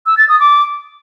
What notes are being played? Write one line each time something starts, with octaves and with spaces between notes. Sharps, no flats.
E6
A6
D#6
D6